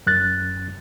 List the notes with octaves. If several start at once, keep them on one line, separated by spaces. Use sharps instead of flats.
F#2 F#6 A6